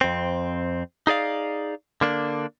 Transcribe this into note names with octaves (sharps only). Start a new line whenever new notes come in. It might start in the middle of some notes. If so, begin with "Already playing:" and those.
F2 C4
D#4 G#4 D5 F5
D3 A#3 D4